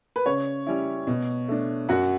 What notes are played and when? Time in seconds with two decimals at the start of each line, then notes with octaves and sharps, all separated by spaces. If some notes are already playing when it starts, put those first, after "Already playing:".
0.16 B4
0.26 C#3 C#5
0.66 G3 C#4 E4
1.07 B2
1.48 A3 D4
1.89 F#2 F#4 F#5